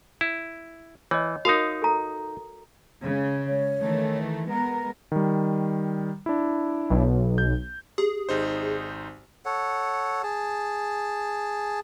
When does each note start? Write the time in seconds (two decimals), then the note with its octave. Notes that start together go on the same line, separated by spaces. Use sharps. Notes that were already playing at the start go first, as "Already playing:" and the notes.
0.21 E4
1.11 E3 C#5 D#5
1.45 D#4 F#4 A#4 F5 D#6
1.82 A4 A#5
3.01 C#3 G#3
3.46 C#5
3.81 D#3 E3 A3
4.50 G#3 B3 A#4 A#5
5.12 D#3 G3
6.26 D4 E4
6.90 B1
7.38 G6
7.98 G4 G#4
8.29 G#1 D#4 C5
9.45 A4 C#5 F#5
10.23 G#4 A5